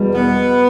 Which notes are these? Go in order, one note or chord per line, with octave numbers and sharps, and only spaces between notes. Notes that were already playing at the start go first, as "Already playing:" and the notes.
Already playing: E2 B2 G3
B3